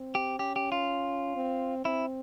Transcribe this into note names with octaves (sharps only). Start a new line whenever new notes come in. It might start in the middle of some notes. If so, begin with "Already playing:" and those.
Already playing: C4
G4
C#4 G4
G4
F4
C4
C4 E4